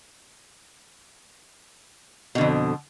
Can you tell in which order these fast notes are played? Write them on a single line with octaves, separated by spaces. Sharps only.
B2 D3 F2